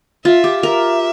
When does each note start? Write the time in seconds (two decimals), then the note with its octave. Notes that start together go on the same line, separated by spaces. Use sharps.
0.25 F4 E5
0.44 G4
0.63 A#4 E5